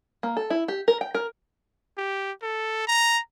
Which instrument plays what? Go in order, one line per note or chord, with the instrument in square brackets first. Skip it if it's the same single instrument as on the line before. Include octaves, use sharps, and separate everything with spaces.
[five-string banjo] A#3
A4
E4
G4
A#4
G5
A#4
[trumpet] G4
A4
A#5